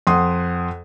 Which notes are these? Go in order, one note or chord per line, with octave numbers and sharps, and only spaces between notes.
F2 F#5 C6 D#6